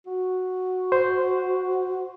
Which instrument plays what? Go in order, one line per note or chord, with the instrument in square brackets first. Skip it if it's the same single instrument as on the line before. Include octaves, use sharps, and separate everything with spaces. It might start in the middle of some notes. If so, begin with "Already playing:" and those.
[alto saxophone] F#4
[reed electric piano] C5